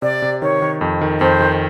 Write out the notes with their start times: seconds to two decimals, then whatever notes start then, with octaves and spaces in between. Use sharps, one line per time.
0.02 C3 D5
0.22 C3
0.42 D#3 C#5
0.62 D#3
0.81 F2
1.01 D#3
1.21 F2 C5
1.41 D#3